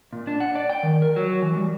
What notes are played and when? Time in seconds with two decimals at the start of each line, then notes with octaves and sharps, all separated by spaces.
0.13 A#2
0.27 D4
0.40 F#5
0.55 D5
0.69 G5
0.83 D#3
1.02 A#4
1.16 F#3
1.42 E3
1.56 G3